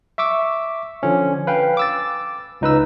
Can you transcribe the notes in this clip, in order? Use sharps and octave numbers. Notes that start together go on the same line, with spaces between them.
E5 C#6 D6 E6
D3 F3 C#4
B4 F5 G5 G#5
D6 E6 A6
C#2 D#4 B4 E6